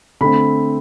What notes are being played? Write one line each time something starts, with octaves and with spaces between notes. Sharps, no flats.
D3 A3 C4 B5